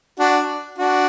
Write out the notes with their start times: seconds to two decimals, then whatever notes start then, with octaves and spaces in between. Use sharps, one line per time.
0.19 D4 F#4
0.79 D4 F#4